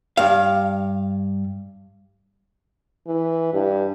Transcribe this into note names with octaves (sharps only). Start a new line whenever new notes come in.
G2 F5
E3
G2